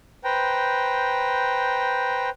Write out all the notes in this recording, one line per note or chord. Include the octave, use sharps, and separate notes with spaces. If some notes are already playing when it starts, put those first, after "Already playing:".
B4 C5 G5 A#5